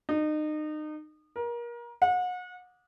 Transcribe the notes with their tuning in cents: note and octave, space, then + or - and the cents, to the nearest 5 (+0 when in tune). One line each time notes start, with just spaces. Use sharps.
D#4 -30
A#4 +30
F#5 -35